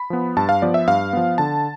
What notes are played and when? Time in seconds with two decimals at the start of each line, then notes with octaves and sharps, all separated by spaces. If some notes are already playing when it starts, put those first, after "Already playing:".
Already playing: B5
0.10 F3 B3
0.37 G2 A5
0.49 F5
0.62 F3 B3 D5
0.74 E5
0.88 G2 F5
1.13 F3 B3
1.38 D3 A5